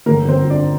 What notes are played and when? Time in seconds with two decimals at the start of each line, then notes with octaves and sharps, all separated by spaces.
0.06 G1 A#3 A#4
0.23 G1
0.28 C4 C5
0.39 F3
0.50 D4 D5